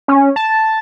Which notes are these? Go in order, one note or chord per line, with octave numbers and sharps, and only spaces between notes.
C#4
A5